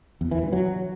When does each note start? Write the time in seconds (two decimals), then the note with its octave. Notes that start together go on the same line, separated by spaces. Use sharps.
0.21 E2
0.31 E3
0.42 G2
0.53 F#3